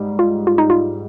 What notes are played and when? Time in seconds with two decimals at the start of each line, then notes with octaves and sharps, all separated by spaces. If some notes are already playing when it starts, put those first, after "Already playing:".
Already playing: G#2 G3
0.19 F4
0.47 F4
0.58 D#4
0.70 F4